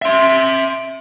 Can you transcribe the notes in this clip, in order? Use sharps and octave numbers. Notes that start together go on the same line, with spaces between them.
E5 C6